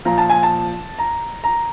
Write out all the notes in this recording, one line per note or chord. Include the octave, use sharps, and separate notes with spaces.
A#2 F3 A#5
A5
G#5
A5
A#5
A#5